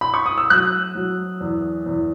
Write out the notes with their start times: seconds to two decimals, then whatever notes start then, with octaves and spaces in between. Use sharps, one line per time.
0.01 B5
0.14 C#6
0.26 D#6
0.38 E6
0.50 F#3 F#6
0.95 F#3
1.41 E2
1.86 E2